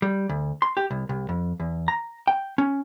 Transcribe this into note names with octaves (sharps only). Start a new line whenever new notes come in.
G3
D2
C6
G4
C2
C2
F2
E2
A#5
G5
C#4